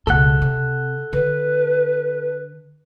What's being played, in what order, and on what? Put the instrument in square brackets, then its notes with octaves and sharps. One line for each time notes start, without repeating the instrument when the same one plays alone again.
[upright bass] C#2 B2 [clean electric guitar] A4 F#5
[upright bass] C3
[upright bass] D3 [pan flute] B4